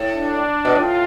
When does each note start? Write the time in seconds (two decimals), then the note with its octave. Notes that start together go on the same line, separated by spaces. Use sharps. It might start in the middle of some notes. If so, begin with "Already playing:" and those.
Already playing: A2
0.13 D4
0.65 B2
0.75 A2 F4